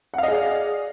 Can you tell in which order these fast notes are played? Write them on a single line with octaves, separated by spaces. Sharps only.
F#5 F5 D#5 G#4 D5